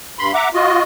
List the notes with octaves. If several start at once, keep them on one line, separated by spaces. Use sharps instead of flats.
G2 B5 C6
E5 F#5 A#5 D6
F4 F#4 D#5